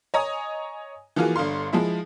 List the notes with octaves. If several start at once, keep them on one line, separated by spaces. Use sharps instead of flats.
C#5 D#5 G#5 A#5 D#6
E3 F3 A#3 F4 F#4 G#4
G1 D3 F5 C6
F3 G#3 E4